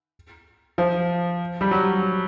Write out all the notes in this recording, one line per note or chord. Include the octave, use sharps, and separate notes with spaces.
F3
G3
F#3